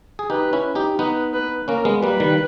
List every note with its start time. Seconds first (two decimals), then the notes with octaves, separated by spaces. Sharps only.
0.19 G#4
0.30 D#4 G4 B4
0.53 C#4 E4
0.75 D#4 G4
0.99 B3 D#4 B4
1.34 B4
1.68 A#3 C#4 A#4
1.85 G#3 B3
2.03 G3 A#3 B4
2.20 D#3 G3